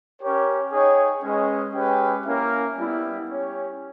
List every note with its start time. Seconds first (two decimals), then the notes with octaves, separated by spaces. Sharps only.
0.22 C#4 G4 A#4 C#5
0.72 D#4 G#4 C#5 G5
1.23 G#3 C#4 G#4 B4 D#5
1.74 G#3 C#4 G4 B4 G5
2.25 A#3 C#4 E4 A#4 E5
2.77 G3 B3 E4
3.27 C#4 G4 C#5